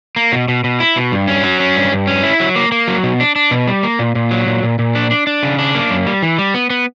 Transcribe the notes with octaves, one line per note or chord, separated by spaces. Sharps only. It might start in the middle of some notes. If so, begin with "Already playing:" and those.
A#3
B2
B2
B2
E4
B2
G2
C#4
F#3
C#4
G2
G2
C#4
E4
F#3
A#3
A#3
F#3
B2
D4
D4
B2
G3
A#3
A#2
A#2
F#3
A#2
A#2
A#2
D4
D4
D4
C#3
D4
A#3
F#2
G3
E3
G3
B3
B3